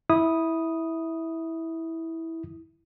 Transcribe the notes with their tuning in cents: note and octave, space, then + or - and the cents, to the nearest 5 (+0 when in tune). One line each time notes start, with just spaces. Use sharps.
E4 -15 D#6 +0